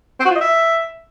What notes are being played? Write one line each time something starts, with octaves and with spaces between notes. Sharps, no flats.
C4
F#4
F4
D#5
E5